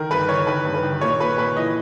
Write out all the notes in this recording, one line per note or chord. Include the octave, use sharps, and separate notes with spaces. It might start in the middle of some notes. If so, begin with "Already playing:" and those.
Already playing: D#3 A#4
G2 B4
D#3 C#5
D#3 B4
G2
B4
D#3
A#2 C#5
A#2 B4
A#2 B4
E3 D#5